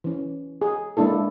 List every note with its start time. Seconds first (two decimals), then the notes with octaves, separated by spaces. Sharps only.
0.04 E3 C#4
0.62 G#4
0.97 G#3 A#3 D4 E4 A4